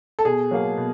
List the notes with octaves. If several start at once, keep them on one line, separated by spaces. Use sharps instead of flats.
A4
B2 G#4
F#3 A#3
B2